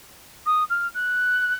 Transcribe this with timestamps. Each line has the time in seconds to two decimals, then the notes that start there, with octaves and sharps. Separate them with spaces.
0.46 D#6
0.70 F6
0.94 F#6